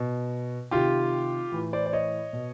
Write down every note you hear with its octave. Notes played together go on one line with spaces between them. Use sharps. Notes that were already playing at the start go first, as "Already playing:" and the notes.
Already playing: B2
C3 D#3 F4 G4
A2 E3
C5 D5
D5
C#5 D#5
B2